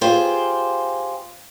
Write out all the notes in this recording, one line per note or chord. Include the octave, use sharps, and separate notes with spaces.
F4 G4 G#4 C5